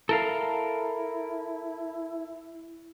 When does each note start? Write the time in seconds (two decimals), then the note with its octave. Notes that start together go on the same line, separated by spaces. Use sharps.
0.09 E4 A4 A#4 F5